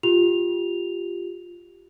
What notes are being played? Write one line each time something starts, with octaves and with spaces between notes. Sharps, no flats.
F4 G4 F7